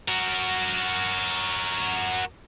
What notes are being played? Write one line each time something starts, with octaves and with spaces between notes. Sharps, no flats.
F#4 A#4